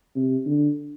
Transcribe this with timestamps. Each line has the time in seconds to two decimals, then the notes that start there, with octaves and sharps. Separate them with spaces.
0.16 C3
0.46 D3